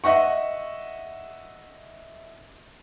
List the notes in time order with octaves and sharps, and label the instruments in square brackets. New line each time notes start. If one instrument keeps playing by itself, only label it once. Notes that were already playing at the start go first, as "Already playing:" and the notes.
[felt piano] D#5 E5 F#5 C#6